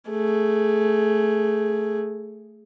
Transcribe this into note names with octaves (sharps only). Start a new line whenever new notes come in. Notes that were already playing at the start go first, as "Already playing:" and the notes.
A3 G#4